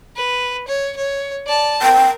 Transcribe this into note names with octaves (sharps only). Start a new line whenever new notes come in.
B4
C#5
C#5
D5 A5
A#4 G5